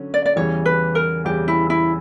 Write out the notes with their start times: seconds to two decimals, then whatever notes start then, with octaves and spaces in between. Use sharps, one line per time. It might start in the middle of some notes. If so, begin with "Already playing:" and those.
Already playing: D3 F#3 C#4
0.14 D5
0.26 D5
0.36 E2 C#3 E3 G3 C#5
0.66 B4
0.95 A#4
1.25 E2 C#3 E3 G3 G4
1.48 E4
1.70 E4